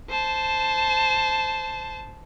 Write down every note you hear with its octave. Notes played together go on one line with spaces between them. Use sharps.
C5 A5